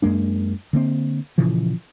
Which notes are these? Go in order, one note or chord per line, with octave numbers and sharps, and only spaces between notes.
F#2 G#3 A#3 D4
D3 A#3 C4
A#2 C#3 E3 F3